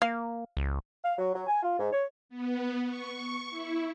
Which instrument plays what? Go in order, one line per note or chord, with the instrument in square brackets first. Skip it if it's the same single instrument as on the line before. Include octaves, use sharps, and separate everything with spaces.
[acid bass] A#3 [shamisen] F5
[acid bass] C#2
[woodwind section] F5
F#3
F#3
G#5
F4
G#2
C#5
[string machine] B3
C#6
E4